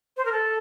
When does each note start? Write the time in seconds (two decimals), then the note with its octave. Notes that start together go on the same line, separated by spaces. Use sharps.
0.17 C5
0.25 A#4
0.32 A4